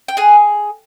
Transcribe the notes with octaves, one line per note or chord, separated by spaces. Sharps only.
G5
G#4 F#5 G#5